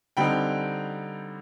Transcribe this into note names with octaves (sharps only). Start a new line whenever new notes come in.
D3 G3 C4 D#4 G5 B5